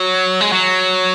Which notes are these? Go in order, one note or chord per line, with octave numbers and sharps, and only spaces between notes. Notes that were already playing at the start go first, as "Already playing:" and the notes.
Already playing: F#3
G#3
F#3